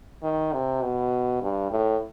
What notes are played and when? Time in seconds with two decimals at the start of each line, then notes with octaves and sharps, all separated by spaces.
0.23 D#3
0.53 C3
0.82 B2
1.42 G2
1.71 A2